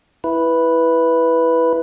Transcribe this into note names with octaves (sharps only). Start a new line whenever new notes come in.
E4 B4